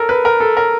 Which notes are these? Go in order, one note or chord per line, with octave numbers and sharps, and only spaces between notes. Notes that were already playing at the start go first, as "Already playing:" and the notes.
Already playing: A4 A#4
B4
A#4
A4
A#4